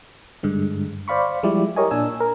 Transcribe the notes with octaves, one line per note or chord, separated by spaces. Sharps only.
G2 D3 G#3
C5 D5 F5 B5 C#6
F3 G3 G#3 E4 G4 D5
G4 A#4 C#5 D#5 G#5
A#2 D4 G#5 E6
A#4